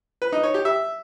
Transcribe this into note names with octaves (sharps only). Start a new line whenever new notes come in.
B4
D#4
C#5
G4
E5